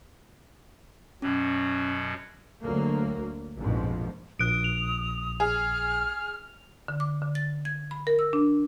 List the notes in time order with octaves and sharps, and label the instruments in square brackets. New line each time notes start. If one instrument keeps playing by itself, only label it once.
[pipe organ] F#2 B2 F#3 [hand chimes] C#4
[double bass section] D2 F#3 A#3
A#1 F2 G#2 B2 F3
[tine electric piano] A#1 [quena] D#6 [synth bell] F#6 D7
[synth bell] F7
[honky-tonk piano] G#4 [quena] F6
[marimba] D3
D6
D3
A6
G#6
B5
A#4
E6
D4